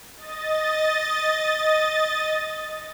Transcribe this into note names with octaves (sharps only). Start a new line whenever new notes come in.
D#5 A6